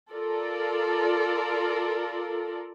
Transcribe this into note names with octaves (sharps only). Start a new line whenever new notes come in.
F4 A4 A#4 D5